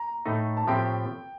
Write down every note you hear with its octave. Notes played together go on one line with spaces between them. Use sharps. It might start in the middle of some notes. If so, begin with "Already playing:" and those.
Already playing: A#5
A2 A3 D#4
A5
A2 F3 A3 C4 G4 G5